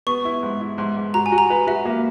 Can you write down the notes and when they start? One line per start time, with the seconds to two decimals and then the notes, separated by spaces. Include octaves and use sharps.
0.07 B3 C#6
0.25 E4
0.43 G#2
0.61 E4
0.78 G#2
0.96 G#2
1.14 F#4 A#5
1.26 G#5
1.32 F#4
1.38 A#5
1.50 B4
1.67 F#4 E5
1.86 A#3